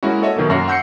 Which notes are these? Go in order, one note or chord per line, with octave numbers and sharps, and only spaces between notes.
G#3 A#3 C#4 E4 F#4
F#4 A4 C#5 D#5 E5
B2 D#3 F#3 A#3
F#2 C#4 F#4 E5 A#6 C7
F#5 E6 G6 A#6 C7 C#7